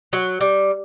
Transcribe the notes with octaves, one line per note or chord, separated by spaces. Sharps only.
F#3
G3